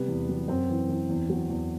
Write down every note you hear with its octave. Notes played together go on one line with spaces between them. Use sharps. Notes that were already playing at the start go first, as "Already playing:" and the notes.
Already playing: C3 G3 B3
E2
F#3
F#2 C4
E3
E3
E2
F#3
E2